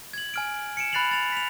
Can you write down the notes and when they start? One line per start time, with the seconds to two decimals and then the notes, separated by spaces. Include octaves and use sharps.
0.13 G#6 F#7
0.34 G#5 F6 D7
0.77 C#7 D7 E7
0.93 B5 F#6 A6 C7 F7 F#7
1.11 A6 F7
1.32 B6 F7